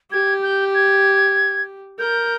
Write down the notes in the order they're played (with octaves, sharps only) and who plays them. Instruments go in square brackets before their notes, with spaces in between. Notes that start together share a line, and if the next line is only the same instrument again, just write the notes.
[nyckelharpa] G4 [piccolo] G#6
[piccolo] G6
G#6
[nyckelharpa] A#4 [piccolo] G6